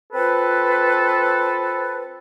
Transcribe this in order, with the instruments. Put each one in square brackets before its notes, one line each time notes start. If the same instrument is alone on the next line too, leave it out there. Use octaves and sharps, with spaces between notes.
[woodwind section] C4 F4 A4 B4